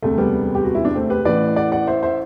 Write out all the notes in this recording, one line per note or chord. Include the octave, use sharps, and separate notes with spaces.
E1 D2 C3 A3
G3 B3
G4
F#4
E4
D4
A3 C4
G4 B4
A1 A2 E3 B4 D5
D5 F#5
D5 F#5
C5 E5
C5 E5